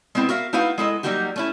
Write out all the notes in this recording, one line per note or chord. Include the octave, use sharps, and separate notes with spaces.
G#3 B3 C4 E4
F#4 A#4 E5 F5
A3 D#4 E4 F#4 B4 F5
G#3 E4 A4 D#5
F#3 G3 A#3 D#4 F#4 G4
A3 C#4 E4